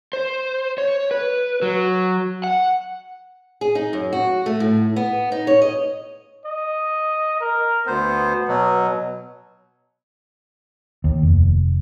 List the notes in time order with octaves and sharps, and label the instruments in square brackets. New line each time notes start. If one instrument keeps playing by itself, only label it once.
[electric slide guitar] C5
C#5
B4
F#3
F#5
[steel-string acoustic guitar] G#4
D#4
F#2
F#4
A3
A2
B3
D#4
C#5
D#5
[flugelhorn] D#5
A#4
[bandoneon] D2 C5 [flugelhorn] B3
[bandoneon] B2 F#3
[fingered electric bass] D#2
F1